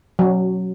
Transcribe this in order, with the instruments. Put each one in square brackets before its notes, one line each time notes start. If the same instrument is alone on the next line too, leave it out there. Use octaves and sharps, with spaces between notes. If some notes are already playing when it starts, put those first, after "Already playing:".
[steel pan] F#3